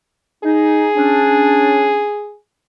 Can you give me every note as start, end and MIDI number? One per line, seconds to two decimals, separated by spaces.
0.44 0.88 63
0.44 2.35 68
0.96 2.04 61
0.96 2.04 62